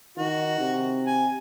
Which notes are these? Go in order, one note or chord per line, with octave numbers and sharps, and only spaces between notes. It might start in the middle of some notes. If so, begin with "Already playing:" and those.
D#3 F#4
C3
G#5